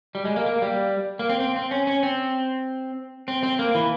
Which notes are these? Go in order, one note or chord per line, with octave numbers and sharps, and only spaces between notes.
G3
G#3
A#3
A#3
G3
A#3
C4
C4
C4
C#4
C#4
C4
C4
C4
A#3
E3